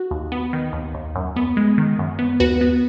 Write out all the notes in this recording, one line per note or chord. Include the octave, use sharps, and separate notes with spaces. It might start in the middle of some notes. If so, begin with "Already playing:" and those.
Already playing: F#4
D#2
B3
D#3
D#2
D#2
F#2
B3
G#3
D#3
F#2
B3
D#2 F#4 B4
B3